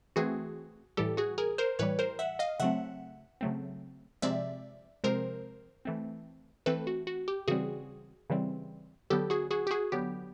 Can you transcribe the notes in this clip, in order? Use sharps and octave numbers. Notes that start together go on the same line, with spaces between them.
E3 A3 C4 F#4 G#4
A2 E3 G3 G4 A4
F#4 G#4
G#4 A#4
A#4 C5
A2 E3 G3 B4 C#5
A#4 C5
E5 F#5
D#5 F5
C#3 F#3 A3 C4 E5 F#5
C#3 F#3 A3 C4
C3 F3 G#3 C4 D5 E5
C3 F3 G#3 C4 A#4 C5
E3 A3 C4
E3 A3 C4 A4 B4
F#4
F#4
G4
C#3 E3 G3 C4 F#4 G#4
C#3 E3 G3 C4
D3 F#3 B3 G4 A4
F#4 G#4
F#4 G#4
G4
F#4 G#4
D3 F#3 B3 G4